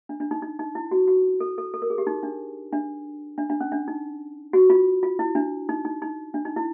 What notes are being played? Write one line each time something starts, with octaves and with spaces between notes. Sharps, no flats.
D4
D4
D#4
D#4
D#4
E4
F#4
F#4
A4
A4
A4
A#4
G#4
G4
D#4
D4
D4
D4
D4
C#4
D4
D#4
F#4
F4
F4
E4
D4
D#4
D#4
D#4
D4
D#4
E4